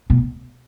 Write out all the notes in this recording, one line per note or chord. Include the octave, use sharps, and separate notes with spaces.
B2